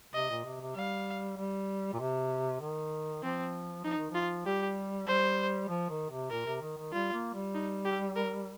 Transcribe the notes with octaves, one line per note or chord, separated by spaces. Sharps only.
C3 D#5
A#2
C3
C3
G3 F5
G3
A#2
C3
D#3
F3 C4
F3 D#4
D#3
F3 F4
G3 G4
G3 C5
F3
D#3
C3
A#2 A#4
C3
D#3
D#3
G3 F4
A#3
G3
D#4
G4
A#4